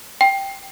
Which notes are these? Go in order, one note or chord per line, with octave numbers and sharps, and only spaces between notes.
G5